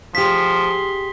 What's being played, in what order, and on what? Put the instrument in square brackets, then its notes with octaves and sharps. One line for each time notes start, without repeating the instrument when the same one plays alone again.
[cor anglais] F3 [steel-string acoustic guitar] G4 F5 [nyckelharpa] G#4 C6 [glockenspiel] B6